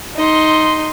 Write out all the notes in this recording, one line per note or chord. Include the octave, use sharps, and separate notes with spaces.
D#4 C6